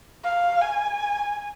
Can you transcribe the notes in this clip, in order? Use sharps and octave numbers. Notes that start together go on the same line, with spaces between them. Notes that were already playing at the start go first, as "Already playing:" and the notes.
F5
G#5